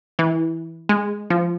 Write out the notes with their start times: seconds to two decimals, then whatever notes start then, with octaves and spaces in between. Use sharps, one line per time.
0.19 E3
0.89 G#3
1.30 F3